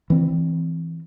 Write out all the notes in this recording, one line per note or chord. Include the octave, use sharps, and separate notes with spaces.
E3 C4